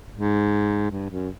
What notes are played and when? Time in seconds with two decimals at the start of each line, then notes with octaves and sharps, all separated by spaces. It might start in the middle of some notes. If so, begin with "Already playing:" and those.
0.16 G#2
0.91 G2
1.10 F#2